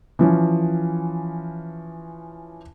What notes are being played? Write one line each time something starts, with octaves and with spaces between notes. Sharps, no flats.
E3 F3 C#4